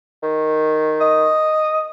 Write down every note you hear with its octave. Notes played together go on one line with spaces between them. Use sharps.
D#3
D#5